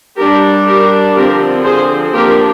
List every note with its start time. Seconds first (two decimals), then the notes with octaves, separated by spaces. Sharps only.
0.17 G3 D4 G4 A#4
0.66 G4 A#4
1.15 D3 F3 C4 G4 A#4
1.65 G#4 C5
2.14 D3 F3 A#3 D4 G4 A#4